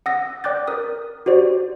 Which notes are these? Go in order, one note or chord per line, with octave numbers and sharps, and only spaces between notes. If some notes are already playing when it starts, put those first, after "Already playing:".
F#5 D#6 E6 A#6
D5 G5 D6 F#6 G6 A6
A#4 D#6
F#4 G4 C5 D5